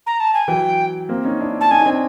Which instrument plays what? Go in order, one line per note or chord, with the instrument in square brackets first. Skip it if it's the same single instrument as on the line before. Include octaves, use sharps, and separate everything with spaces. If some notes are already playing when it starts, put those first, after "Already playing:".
[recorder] A#5
A5
G#5
[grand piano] E3 F#3 [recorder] G5
[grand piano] A#3 C4
C#4 D#4
D4 E4
[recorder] A5
[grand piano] C#4 D#4 [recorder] G#5
[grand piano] D#4
C4 D4